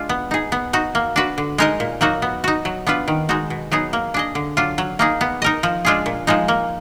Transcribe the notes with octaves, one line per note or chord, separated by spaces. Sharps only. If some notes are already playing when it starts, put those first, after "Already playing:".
Already playing: G#3 D4 F4
B3
D#4 G#4
B3
D#4 F#4
A#3
D4 F#4 B4
D3
G#3 D#4 A#4 D#5
A#2
F#3 A#3 D#4 F#4
B3
D#4 F#4
F#3
B3 D4 F4 B4
D#3
G#3 D#4 F#4
B2
F#3 B3 D#4 G#4
A#3
D4 G#4 D#5
D3
F#3 D4 F4
F#3
A#3 D#4 G#4
B3
D#4 A#4 D#5
F3
G#3 D4 F4 G#4
A#2
F3 G#3 D#4
A#3